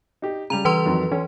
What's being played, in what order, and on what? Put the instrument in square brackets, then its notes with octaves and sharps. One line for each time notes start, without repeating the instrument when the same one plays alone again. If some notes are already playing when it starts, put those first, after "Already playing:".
[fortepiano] D#4 G4
[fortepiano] C#3 G3 [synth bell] A#5 F7
[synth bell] E3 B4 C6
[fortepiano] F2 D#3 F#3
[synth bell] E3 [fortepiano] C#4